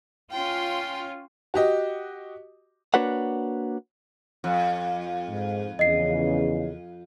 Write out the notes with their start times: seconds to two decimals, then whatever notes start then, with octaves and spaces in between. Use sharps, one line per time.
0.31 C#4 F4 G5 C6
1.54 F#4 G4 D#5
2.94 A#3 D4 F#4 B4 C#5 F#5
4.44 F2
5.30 G#2
5.79 E2 C#3 D#5 C7